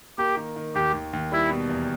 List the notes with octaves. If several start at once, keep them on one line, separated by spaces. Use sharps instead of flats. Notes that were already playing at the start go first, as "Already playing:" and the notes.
A#3 G4
D#3
D#3
D#2 G4
D#2
D#2
G3 E4
B2
E2